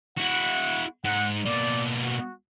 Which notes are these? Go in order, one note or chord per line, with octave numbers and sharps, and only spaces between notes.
E4 F#4 F#5
G#2 F#5
B2 A#3 D5
F#4